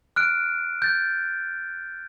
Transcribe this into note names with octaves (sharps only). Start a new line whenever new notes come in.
F6 F#6 D7
G6 A6